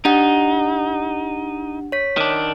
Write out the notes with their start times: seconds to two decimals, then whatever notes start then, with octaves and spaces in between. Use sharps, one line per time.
0.05 D4 D#4 G4 F#5
1.92 C#5 B6
2.17 D#3 D4